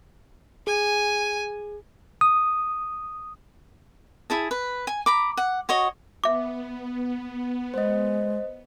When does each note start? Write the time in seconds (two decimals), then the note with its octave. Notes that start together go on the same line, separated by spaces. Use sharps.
0.67 G#4 G#5
2.21 D#6
4.30 E4 G#4 A5
4.51 B4
4.87 G#5
5.06 A#5 B5 D6
5.37 F#5
5.69 F#4 C#5 D#5
6.24 B3 E5 D6
7.74 G#3 C5 D#5